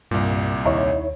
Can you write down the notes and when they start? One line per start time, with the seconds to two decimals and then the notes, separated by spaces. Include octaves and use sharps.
0.11 C2 G2 A#2
0.65 D#2 D#4 E4 C#5